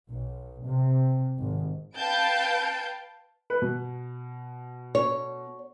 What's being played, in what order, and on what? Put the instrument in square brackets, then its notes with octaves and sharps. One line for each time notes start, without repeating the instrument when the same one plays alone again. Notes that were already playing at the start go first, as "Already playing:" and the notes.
[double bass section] B1
C3
G#1
[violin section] B4 F5 G5 A5 G6 D7
[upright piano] B4
B2
[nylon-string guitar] C#5